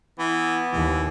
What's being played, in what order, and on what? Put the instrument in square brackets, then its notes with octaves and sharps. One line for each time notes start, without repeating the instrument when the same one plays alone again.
[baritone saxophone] E3 [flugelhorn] B3
[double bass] D#2 [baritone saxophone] E3